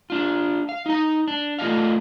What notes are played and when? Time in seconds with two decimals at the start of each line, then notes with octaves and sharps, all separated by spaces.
0.10 D4 F4
0.69 F5
0.86 D#4 A#5
1.28 D4
1.59 A3 F4 D5 D#5 F5